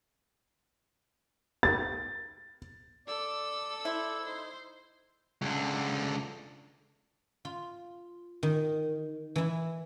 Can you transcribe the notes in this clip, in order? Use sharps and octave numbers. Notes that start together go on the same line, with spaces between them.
A6
A4 D5 E6
E4 C5 D5
D#4 C5
C#2 D3
F4
D#3
E3 E4